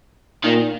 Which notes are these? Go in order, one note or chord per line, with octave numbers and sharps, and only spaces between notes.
A#2 D#3